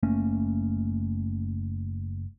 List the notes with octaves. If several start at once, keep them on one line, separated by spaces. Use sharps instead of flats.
F#1 A3 A#3 C#4